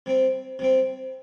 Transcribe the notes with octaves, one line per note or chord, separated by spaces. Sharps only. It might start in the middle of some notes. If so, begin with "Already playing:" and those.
C3 G3 C4
C3 G3 C4